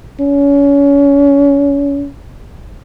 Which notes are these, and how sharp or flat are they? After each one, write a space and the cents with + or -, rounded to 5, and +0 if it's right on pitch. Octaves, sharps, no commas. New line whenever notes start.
C#4 +30